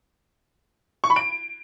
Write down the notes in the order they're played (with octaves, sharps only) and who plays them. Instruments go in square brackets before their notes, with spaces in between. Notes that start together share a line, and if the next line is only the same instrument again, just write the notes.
[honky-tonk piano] C#6
B5
D7